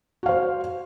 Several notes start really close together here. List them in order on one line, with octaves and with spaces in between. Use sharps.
F#4 F5 C5